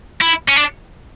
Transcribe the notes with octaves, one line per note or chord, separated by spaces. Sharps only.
E4
C#4
D4